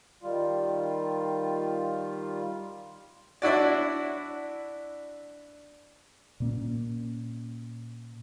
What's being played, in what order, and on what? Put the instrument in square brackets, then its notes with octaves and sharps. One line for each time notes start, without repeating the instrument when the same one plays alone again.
[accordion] D#3 G3 F4
[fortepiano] D4 E4 F#4 D5
[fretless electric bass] A#2 A#3 C#4